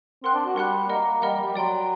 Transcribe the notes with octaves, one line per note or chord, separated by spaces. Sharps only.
C4 A#4 F#5 C6 F#6
D4
F#4
G3 A#4 F#5 C6 F#6
A#3 A#4 D#5 F#5
G3 A#4 D#5 F#5
G3
G3
F#3 D5 G5 C6